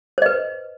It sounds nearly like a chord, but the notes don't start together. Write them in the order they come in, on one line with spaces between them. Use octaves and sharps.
C5 D#5 B4